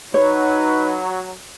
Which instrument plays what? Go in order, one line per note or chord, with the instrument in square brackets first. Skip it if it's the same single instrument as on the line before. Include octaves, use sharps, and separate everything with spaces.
[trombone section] F#3 [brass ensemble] D#4 B4 [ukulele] C#5